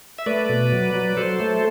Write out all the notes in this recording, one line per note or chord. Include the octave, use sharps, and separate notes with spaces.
E5
A3 B4 D5
B2
F#3
F#3
F#3 A4 C5
A3